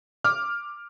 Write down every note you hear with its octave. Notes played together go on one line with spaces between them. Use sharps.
D6 F6